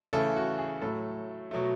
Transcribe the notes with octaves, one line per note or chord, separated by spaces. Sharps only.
C#3 E3 A3 A4
F#4
G#4
A2 F#3 A3 A4
B2 F#3 A3